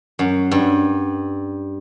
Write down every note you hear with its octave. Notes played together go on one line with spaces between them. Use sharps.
F#2
G2